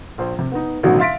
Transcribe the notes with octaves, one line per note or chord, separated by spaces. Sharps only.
A#1 C5
C3
B3 D#4
A1 B2 D3 D#3 F#3
E5 F5 C6 A6 B6 D7